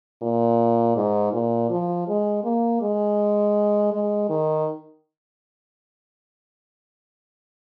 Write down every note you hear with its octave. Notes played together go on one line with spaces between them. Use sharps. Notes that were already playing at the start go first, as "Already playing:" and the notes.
A#2
G#2
A#2
F3
G#3
A#3
G#3
G#3
D#3